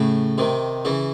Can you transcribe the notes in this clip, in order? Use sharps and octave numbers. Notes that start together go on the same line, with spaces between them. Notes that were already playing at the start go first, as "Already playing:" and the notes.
Already playing: A2 C#3
C3 D#3
C#3 E3